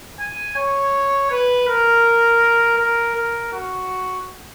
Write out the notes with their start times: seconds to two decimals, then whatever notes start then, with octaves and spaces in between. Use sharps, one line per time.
0.20 G#5
0.56 C#5
1.31 B4
1.68 A#4
2.78 A#4
3.15 A#4
3.53 F#4